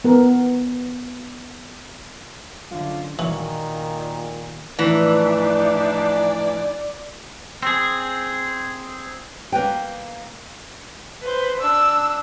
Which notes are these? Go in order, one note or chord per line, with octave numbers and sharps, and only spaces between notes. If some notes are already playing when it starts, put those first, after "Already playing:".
B3 A#4
F#2 D3 F4
D#2 A#2 D#3 E3 F#4
A2 E3 F3 D4 D#4 D5 E5
C4 G#4
A#3 B4 G5
B4 C5
D4 E6